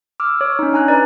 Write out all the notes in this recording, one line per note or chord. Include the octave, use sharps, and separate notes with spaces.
D6 E6 F6
C#5
C#4 D#4
D4 G#5 A#5 F#6
B4 D5